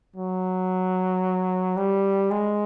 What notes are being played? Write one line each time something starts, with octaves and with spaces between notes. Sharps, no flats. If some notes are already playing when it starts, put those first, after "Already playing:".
F#3
G3
G#3